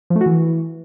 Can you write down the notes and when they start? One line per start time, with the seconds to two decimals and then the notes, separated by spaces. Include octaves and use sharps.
0.10 F3
0.16 A3
0.21 F#4
0.26 E3